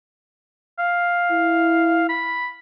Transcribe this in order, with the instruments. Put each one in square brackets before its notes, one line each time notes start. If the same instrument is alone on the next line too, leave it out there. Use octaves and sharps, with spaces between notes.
[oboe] F5
[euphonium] E4
[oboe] B5